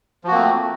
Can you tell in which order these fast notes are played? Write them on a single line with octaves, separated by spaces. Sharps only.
F3 F#4 A#3 C4 A3